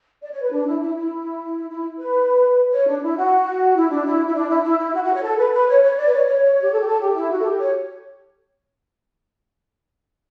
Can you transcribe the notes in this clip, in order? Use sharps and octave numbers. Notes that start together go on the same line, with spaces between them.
D5
C#5
B4
D4
E4
E4
E4
E4
B4
C#5
D4
E4
F#4
E4
D4
E4
E4
D4
E4
E4
E4
F#4
F#4
C#5
A4
B4
B4
C#5
C#5
D5
B4
C#5
C#5
G4
A4
G4
A4
G4
E4
F#4
A4
G4
C#5